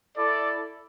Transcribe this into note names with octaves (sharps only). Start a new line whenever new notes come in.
E4 A4 D5